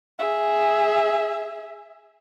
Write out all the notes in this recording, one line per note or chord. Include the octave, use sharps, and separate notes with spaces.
G#4 E5